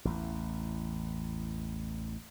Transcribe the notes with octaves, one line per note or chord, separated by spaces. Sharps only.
A1 E2